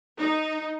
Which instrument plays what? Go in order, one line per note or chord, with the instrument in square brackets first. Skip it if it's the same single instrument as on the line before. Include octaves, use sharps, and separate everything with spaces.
[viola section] D#4